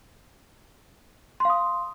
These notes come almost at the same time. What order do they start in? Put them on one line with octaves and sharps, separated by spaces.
C6 F5 D#6